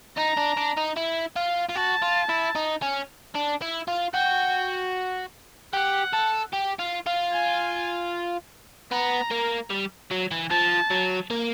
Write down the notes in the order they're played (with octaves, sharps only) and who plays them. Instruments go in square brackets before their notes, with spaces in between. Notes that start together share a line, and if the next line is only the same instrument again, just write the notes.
[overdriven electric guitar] D#4 [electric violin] A#5
[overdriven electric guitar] D4
D4
D#4
E4
F4
F4
[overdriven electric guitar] F#4 [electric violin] A5
[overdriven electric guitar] F4
E4
D#4
C#4
D4
E4
F4
[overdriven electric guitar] F#4 [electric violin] G5
[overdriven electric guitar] G4 [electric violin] F#5
[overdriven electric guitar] A4
G4
F4
F4
[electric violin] G#5
[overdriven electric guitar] B3 [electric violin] A#5
[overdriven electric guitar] A#3
G3
F#3
E3
[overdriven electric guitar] F3 [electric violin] A5
[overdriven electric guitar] F#3
A#3